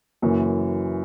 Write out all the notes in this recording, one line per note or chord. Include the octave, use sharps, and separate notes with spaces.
F#1 F#2 E3